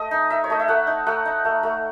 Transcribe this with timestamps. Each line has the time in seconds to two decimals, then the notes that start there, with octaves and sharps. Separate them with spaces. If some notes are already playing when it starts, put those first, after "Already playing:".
Already playing: A3 D#5
0.11 D#4
0.30 D#4 E5
0.44 C#5
0.50 A3 D#5
0.59 E5
0.68 A3 F#5
0.87 D#4
1.07 A3 F#5
1.25 D#4
1.45 A3
1.63 A3